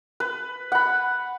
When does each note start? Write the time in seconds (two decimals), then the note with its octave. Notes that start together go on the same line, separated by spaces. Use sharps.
0.20 B4
0.72 F#5 B5